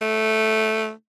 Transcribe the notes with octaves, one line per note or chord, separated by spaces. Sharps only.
A3